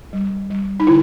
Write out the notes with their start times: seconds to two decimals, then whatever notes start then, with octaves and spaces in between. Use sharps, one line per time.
0.13 G3
0.50 G3
0.80 D#4
0.87 D3 E4